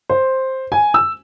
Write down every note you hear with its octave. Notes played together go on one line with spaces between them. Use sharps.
C5
G#5
E6